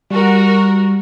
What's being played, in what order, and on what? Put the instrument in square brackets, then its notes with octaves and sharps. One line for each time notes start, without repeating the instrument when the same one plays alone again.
[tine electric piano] G3 [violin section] F#4 A#4